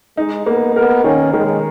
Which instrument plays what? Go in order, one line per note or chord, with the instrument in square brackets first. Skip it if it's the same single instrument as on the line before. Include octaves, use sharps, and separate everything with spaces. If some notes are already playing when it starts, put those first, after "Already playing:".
[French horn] G#3 [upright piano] D#4
[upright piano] A#3 [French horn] B3
[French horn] B3 [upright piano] A#4
[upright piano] D#3 [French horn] C#4
[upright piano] D#3 [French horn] G#3